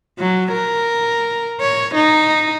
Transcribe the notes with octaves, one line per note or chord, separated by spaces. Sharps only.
F#3
A#4
C#5
D#4